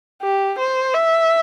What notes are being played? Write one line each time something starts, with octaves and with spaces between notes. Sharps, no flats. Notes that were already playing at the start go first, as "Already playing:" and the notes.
G4
C5
E5